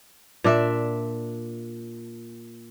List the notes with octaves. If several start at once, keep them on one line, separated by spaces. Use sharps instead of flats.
A#2 D4 E5